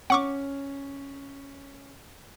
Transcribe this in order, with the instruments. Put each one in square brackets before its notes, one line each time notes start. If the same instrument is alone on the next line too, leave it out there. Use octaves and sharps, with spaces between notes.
[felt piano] C#4 [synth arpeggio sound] F#5 C#6 D6